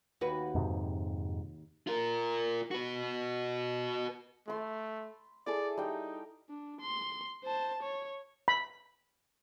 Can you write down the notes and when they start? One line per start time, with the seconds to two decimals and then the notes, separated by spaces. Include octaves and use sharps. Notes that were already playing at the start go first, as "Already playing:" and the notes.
0.21 D#2 F#4 B4
0.55 F2 G#2 C3
1.87 F4 A#4
2.71 F#4 B4
4.48 A3 B5 C6
5.47 E4 G#4 A4 D5
5.77 G3 D#4 G5
6.49 D4
6.81 C6
7.44 C5 A5
7.83 C#5
8.48 B5